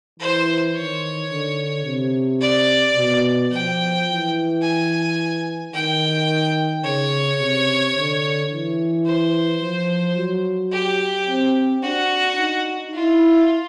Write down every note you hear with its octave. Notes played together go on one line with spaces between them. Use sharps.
E3 C5
D#3 C#5
D3
C3
D5
B2
F3 G5
E3
G#5
D#3 G5
C#3 C#5
C3
D3
E3
C5
F3
F#3
G4
C4
D4 F#4
D#4
E4 F4